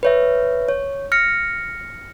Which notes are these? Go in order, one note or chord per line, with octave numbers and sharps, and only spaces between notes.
B4 C#5 E5
C#5
F6 A#6 C#7